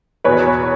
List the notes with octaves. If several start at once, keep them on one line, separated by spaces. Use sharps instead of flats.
E2 B2 B4 C#5